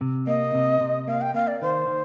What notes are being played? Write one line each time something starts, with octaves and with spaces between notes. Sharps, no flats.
C3
A#3 D#5
C3
C3
A#3 F5
G5
A#3 F5
D5
D#3 C5
D#3